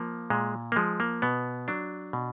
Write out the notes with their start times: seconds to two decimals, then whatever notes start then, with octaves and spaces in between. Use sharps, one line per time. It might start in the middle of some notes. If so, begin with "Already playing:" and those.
Already playing: F3 A#3
0.30 A#2 G#3
0.72 A#3
0.76 F3 G#3
1.00 A#3
1.22 B2 B3
1.68 F#3 D4
2.13 B2